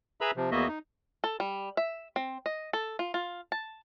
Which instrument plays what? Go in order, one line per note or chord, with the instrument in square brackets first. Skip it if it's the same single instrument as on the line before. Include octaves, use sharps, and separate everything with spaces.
[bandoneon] G#4 B4 E5 A#5 B5 E6
C3 F3
E2 A#3 B3 F#4 D#5 E5
D#4
[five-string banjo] A4
G3
E5
C4
D#5
A4
F4
F4
A5